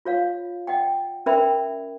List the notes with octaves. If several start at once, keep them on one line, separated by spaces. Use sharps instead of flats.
F4 C#5 F5
D#5 F#5 G5
C#4 A#4 D5 E5 G5 B5